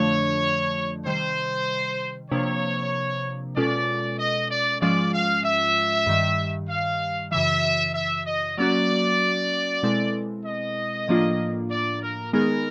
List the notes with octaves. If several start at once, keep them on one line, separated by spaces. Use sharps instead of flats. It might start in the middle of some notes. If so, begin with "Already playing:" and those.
Already playing: F2 D3 F3 A3 D4 C#5
C3 D#3 G3 C5
C3 F3 A#3 D4 C#5
B2 G#3 C#4 F4 A4 D5
D#5
D5
G#2 F3 G#3 C#4 F4 D5
F5
E5
G2 D#3 G3
F5
F#2 C#3 E3 E5
E5
D#5
F#3 A#3 C#4 F#4 D5
B2 G#3 C4 E4 A4
D#5
A2 F3 A#3 D4 F4
D5
A#4
D#3 G#3 B3 D#4 G#4 A#4